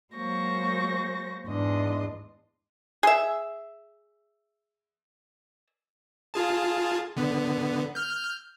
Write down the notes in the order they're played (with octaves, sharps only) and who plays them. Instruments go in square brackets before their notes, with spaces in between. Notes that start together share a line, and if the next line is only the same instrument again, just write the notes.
[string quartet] F#3 G#3 A#3 C5 C#6 A#6
E2 G#2 D4 D#5 C6
[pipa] G#4 E5
[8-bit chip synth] F4 G#4 A5
D3 B3
F6 G6